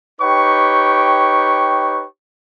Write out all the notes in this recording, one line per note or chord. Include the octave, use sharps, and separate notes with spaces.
D#4 G4 B4 C#5 G5 C#6